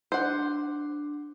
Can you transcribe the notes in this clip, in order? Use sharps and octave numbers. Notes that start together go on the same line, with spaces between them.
D4 C5 F#5